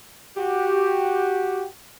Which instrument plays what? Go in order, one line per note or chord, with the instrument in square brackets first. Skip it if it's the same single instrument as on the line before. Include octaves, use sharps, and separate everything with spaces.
[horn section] F#4 G4